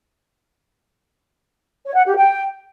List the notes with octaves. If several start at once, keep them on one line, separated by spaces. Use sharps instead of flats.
C#5
F#5
G4
G5